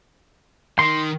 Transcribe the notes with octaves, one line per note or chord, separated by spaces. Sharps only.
D#3 C6